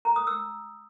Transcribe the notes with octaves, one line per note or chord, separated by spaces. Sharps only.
A#5
D#6
E6